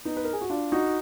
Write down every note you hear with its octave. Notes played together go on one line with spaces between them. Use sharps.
B3 D#4
B4
A#4
G#4
F#4
D4 F4
D#4 F#4